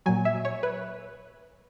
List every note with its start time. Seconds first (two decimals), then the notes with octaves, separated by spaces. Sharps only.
0.06 A#2 F#3 G#5
0.25 E5
0.45 C#5
0.63 B4